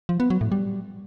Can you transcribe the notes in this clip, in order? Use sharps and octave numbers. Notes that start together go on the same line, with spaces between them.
F3
B3
F#3
A2
G3